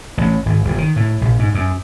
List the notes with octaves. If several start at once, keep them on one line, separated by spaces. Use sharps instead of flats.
A1
G#1
G1
D#3
A2
A#1
G#2
F#2